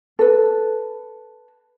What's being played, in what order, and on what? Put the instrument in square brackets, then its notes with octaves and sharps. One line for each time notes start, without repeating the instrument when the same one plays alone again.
[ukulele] A4 B4